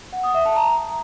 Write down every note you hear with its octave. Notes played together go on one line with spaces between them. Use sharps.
F#5
D#6
E5
A5
A#5